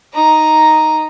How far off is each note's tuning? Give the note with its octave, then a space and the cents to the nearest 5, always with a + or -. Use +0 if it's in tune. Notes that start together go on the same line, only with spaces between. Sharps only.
D#4 +0 A#5 +0